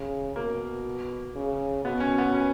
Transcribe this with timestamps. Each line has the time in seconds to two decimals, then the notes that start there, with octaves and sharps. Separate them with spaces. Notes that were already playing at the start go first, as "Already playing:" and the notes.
Already playing: C#3
0.36 B2 A#3
1.35 C#3
1.84 B2 B3
2.00 C#4
2.18 B3
2.34 C#4